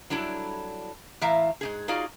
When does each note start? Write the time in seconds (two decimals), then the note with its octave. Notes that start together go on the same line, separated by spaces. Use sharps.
0.10 F#3 G3 D4 E4 A4
1.21 A2 E3 E5 F5 A#5
1.61 G#2 C#3 G#4
1.88 D#4 F4 F#4 G#4 D5 F5